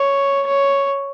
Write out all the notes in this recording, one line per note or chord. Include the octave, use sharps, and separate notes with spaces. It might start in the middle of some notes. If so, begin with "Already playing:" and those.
Already playing: C#5
C#5